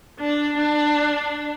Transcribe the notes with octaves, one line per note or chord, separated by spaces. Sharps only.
D4
D4